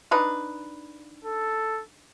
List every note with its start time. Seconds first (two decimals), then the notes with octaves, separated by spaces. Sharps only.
0.11 D4 D#4 B4
1.25 A4